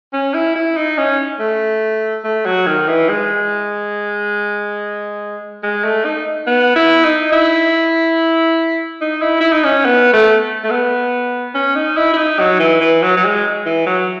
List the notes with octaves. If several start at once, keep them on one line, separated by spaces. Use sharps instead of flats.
C#4
E4
E4
D#4
C#4
A3
A3
F#3
D#3
E3
G#3
G#3
A3
D#4
B3
E4
D#4
E4
D#4
E4
E4
D#4
C#4
B3
A3
A3
B3
C#4
D#4
E4
E4
D#4
F#3
E3
E3
F#3
F#3
G#3
E3
F#3